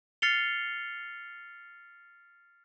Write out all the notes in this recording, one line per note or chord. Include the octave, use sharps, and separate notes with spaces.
F6 A6 C7 C#7 F7 G7